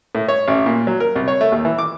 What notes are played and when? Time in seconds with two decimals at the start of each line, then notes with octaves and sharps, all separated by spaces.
0.15 A2
0.28 C#5
0.48 A1
0.66 A#2
0.87 F#3
1.00 A#4
1.16 C2
1.28 C#5
1.41 A3
1.52 D#2
1.65 E3
1.78 D6